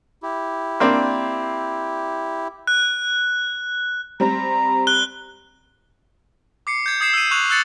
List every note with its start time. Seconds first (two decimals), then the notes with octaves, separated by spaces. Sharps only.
0.23 E4 G4
0.80 A#3 C4 D4
2.67 F#6
4.20 G3 C4 A#5
4.87 F#6 G7
6.67 D6 C7 C#7
6.86 G6 G#6
7.01 D#6 G#6 C7 E7
7.13 E6 G6 D#7
7.31 C#6 F#6 F7 F#7
7.50 E6 F#6 G#6 A6 C#7 F#7